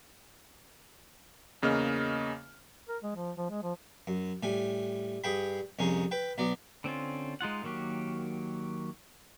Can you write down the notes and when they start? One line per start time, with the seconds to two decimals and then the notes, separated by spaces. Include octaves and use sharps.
1.62 E2 C#3 A#3 D#5 F6
2.89 A#4
3.03 G#3
3.15 F3
3.37 F3
3.50 G#3
3.63 F3
4.07 F#2
4.43 A2 G3 G#5
5.24 G2 G#4 G5 B5
5.79 C2 F2 C#4 D#4 G#4
6.11 B4 G5
6.38 B1 F#3 B3 D5
6.84 D3 C4 C#4 F4
7.41 G#3 D#4 F4 F#5
7.63 D#3 F#3 A#3 F#4 G4